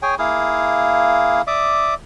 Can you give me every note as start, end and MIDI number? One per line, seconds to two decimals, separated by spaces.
0.02 0.15 68
0.02 0.15 73
0.02 0.15 79
0.02 0.15 80
0.19 1.42 58
0.19 1.42 64
0.19 1.42 68
0.19 1.42 77
1.47 1.94 74
1.47 1.94 76
1.47 1.94 86
1.47 1.94 87